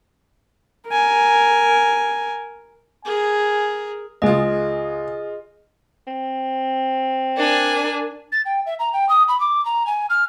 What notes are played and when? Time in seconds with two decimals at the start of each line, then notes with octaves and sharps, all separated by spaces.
0.88 A#4 G#5
3.05 G#4 A#4 G#5
4.22 C#2 G#3 F4 G#4 D#5 D#6
6.07 C4
7.37 D4 A#4 G#5
8.32 A6
8.46 G5
8.66 E5
8.80 A#5
8.93 G5
9.09 D#6
9.28 B5
9.40 D6
9.65 A#5
9.87 G#5
10.10 F6